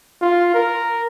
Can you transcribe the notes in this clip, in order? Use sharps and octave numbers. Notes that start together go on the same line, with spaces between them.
F4
A#4